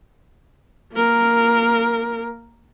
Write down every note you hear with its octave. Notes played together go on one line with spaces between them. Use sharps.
A#3 A#4